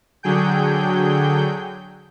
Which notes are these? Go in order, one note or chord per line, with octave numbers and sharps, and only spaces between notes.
D3 F#3 G#4 G5 G6